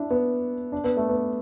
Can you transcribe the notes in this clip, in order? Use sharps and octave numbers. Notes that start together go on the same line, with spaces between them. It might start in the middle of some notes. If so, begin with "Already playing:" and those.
Already playing: D4 E4
B3
D4
B3
A3
B3